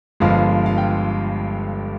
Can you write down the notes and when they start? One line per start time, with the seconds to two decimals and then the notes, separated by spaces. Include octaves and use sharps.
0.20 G1 G2 F3 G#3 F5
0.66 F5
0.78 G5